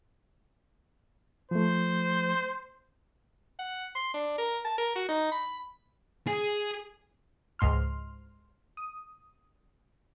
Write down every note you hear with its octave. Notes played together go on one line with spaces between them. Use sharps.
F3 A3 C5
F#5
C6
D4
A#4
A5
A#4
F#4
D#4
B5
G#4
C#2 G#2 C6 F6
D#6